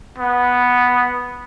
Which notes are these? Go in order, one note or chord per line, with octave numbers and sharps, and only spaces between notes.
B3